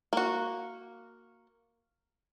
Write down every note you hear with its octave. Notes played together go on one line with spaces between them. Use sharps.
A#3 F#4